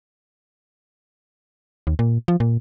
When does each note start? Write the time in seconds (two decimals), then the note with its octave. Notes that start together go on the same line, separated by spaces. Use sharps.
1.87 D#2
1.99 A#2
2.28 F3
2.40 A#2